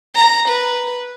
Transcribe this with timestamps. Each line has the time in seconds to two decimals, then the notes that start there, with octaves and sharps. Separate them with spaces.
0.15 A#5
0.49 B4